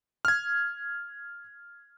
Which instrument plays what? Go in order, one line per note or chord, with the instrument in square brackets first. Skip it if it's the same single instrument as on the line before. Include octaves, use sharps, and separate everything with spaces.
[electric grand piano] F6 G#6